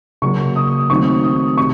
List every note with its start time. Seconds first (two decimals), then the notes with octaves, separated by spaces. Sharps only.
0.22 C#3 F#3 A#3 C#6
0.56 D#6
0.90 D#3 F#3 A3 C4 D#4 C#6
1.24 D#6
1.58 C3 C#6